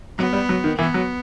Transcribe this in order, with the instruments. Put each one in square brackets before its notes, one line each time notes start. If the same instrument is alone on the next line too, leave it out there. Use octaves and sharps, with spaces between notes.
[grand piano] F#3 [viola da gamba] B3
[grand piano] G3
F#3
D#3
[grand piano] E3 [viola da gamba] B3
[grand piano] F#3